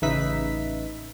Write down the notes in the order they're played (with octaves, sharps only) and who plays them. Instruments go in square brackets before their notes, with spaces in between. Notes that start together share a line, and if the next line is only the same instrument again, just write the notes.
[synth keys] A1 C#3 D#4 B4 E5 B6